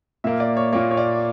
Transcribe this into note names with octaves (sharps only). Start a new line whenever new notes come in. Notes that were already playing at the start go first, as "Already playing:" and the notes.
A#2 A#3 E5
D5
C#5
A#2 A#3 C#5
C#5
D5